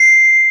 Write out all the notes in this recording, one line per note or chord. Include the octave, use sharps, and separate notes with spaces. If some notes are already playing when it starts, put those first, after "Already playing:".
Already playing: C7